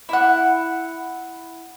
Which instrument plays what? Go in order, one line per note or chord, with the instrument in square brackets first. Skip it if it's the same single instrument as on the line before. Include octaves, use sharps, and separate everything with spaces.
[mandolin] E4 F#5